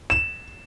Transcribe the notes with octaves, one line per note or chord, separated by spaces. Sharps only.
E7